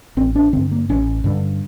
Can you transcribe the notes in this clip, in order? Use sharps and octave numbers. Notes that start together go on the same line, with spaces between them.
A1 C4
D4
G2 D3 C4
A#3
A1 C#4
G2 D3